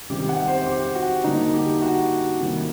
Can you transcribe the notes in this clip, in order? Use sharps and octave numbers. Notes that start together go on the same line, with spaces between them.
C3 D#3 G3 C4 G4
F#5
C5
G4
F#4
D3 G3 A#3 D#4
G4
F#4
C3 D#3 G3 A#3